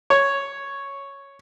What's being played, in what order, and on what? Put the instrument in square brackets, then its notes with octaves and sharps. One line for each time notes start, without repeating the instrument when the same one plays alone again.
[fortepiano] C#5